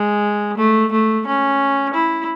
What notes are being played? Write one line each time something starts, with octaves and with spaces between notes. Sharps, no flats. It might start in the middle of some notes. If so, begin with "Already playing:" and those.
Already playing: G#3
A3
A3
C#4
E4